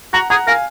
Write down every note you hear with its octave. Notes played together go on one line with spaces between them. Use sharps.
F#4 F#5 A#5
G#4 F#5 A#5
A#4 F5 G#5